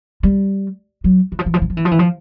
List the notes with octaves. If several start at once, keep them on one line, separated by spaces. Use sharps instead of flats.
G3
F#3
E3
F3
E3
F3
E3
F3
E3
F3
E3
F3